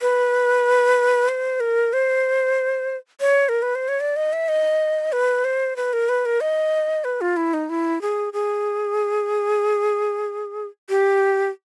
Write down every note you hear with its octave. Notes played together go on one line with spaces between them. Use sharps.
B4
C5
A#4
C5
C#5
A#4
B4
C5
C#5
D5
D#5
E5
D#5
B4
C5
B4
A#4
B4
A#4
D#5
B4
F4
E4
D#4
E4
G#4
G#4
G4